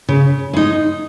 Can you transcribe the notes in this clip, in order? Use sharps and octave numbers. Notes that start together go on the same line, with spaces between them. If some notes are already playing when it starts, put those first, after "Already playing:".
C#3
G#3 D#4